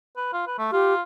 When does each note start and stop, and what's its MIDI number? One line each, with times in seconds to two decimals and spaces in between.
0.17 0.33 71
0.33 0.42 65
0.47 0.56 71
0.58 0.70 57
0.72 1.01 65
0.72 0.94 67